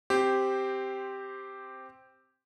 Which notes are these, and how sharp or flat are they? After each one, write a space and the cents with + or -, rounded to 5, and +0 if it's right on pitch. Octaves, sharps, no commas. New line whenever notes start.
C4 +0 G4 +0 C5 -5